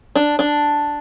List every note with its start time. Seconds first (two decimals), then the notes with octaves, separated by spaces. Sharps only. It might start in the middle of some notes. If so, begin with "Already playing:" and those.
0.15 D4
0.39 D4